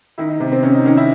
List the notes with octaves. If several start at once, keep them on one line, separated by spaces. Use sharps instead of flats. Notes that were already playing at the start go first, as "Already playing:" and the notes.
D#3 E4
D#4
C3
C4
C3 C#4
D#4
D#3 C#4
E4